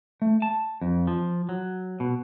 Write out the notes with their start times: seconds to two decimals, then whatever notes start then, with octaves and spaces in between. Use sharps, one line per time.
0.22 A3
0.42 A5
0.81 F2
1.07 F3
1.49 F#3
2.00 B2